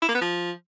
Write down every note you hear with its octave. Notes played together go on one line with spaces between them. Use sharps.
E4
A#3
B3
F3